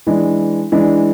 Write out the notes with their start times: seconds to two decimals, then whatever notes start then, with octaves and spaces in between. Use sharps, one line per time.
0.07 E3 G#3 D4
0.72 E3 G#3 D4